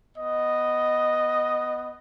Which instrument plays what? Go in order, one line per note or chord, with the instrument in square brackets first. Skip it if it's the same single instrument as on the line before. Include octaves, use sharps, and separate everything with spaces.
[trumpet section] B3 D#5